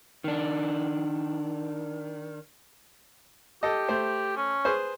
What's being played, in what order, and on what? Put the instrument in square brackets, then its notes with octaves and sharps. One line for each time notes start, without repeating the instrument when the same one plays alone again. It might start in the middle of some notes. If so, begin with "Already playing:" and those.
[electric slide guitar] D#3 D4
[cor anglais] G4 [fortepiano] A4 D#5
[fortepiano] A3 C5
[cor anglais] C#4
[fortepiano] G#4 B4 C5